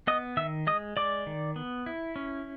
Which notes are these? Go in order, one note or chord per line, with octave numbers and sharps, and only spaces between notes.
B3 D#5 D#6
D#3 E5 E6
G#3 D#5 D#6
G#3 D5 D6
D#3
B3
E4
C#4